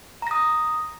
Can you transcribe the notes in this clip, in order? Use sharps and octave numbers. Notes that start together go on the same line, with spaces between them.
A#5 D#6 A#6